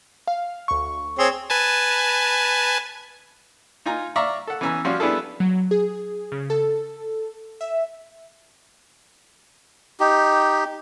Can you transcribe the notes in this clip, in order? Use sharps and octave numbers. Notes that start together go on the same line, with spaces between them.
F5
D2 C#6
C4 G#4 C#5 C7
B4 G#5 A5
D#4 F4 G#5 A#5
D5 E5 F5 A#5 C#6
A4 F#5
E3 B3 C#4 G#5 A#5 E6
F3 G3 C#4 F#4 F5 C6
G3 B3 D4 E4 G#4 A4
F#3
G#4
C#3
A4
E5
D#4 G4